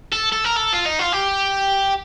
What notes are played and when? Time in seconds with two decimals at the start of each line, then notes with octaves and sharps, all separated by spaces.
0.12 A4
0.33 A4
0.45 A#4
0.57 A4
0.73 F4
0.86 D#4
0.99 F4
1.12 G4